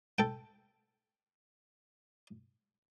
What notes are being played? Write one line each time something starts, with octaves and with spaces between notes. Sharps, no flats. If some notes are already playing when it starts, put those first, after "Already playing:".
A4 G5